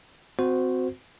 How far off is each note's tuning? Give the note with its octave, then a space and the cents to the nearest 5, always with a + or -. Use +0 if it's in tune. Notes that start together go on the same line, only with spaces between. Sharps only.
C4 -25 F#4 -15 C5 -15